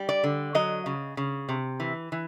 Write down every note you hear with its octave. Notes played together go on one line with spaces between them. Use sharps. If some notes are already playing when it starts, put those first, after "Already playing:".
Already playing: G3
D5
D3
F#3 D#5
C#3
C#3
C3
E3
E3